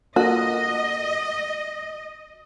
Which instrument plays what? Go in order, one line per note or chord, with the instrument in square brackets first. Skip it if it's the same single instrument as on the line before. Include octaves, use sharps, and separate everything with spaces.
[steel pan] A#3 F4 A4 [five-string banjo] F#4 [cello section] D#5